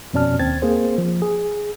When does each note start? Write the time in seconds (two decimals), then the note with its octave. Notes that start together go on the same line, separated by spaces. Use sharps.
0.13 F2 B2 C#4 D5 A5 F6
0.40 D#2 C4 G#6 A6
0.62 A#3 C4 G#4 C5
0.98 F3
1.22 G#4